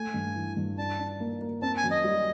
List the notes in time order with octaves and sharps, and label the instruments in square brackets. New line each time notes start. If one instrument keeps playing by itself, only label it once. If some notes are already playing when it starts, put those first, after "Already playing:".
Already playing: [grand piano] A3 [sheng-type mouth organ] G#5
[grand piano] G2
E3
G2
[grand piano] D4 [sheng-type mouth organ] A5
[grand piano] D4
A#3
A#3
[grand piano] C4 [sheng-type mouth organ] A5
[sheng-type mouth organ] G#5
[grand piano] F#2
[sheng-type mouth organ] D#5
[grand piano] G3